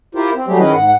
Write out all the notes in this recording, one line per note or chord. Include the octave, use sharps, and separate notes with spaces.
E4 F4 G4 A#4 C5
C4
F#3 G3 A3 G4 G#4
D#3 C#4 E4 G#4 B4 D#5
G#2 F#5